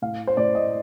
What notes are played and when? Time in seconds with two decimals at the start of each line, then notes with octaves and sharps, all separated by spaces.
0.02 A2 F5
0.27 C5
0.37 A2 D5
0.55 D#5